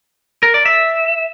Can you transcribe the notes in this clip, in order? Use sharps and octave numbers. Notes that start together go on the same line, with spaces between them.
A#4
D5
E5